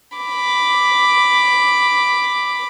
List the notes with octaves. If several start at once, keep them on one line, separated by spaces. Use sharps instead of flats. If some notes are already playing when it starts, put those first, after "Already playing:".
B5 D6